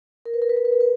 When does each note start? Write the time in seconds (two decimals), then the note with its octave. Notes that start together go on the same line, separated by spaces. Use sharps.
0.25 A#4
0.34 B4
0.42 A#4
0.49 B4
0.57 A#4
0.65 B4
0.72 A#4
0.81 B4